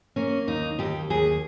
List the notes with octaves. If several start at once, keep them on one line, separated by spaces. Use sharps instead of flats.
A#3 C#4
D#2 D#4
D#2 G4
D#2 G#4